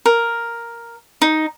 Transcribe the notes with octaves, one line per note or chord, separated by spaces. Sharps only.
A#4
D#4